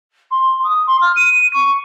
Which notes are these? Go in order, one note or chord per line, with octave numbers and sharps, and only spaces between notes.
C6
D#6
C6
F6
D#7
C#6